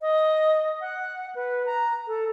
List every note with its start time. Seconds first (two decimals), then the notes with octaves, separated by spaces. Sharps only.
0.01 D#5
0.81 F#5
1.35 B4
1.66 A#5
2.07 A4